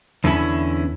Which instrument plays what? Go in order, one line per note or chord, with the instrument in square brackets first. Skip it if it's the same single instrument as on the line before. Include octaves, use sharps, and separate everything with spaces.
[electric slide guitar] E2 D3 F#3 C#4 E4